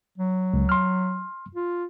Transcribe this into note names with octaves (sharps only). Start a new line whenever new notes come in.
F#3
C#2
C6 F6
F4